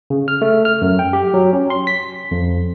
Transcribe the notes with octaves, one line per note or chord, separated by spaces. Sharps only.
C#3
F6
A3
F6
F#2
G5
G4
F#3
C#4
C6
B6
F2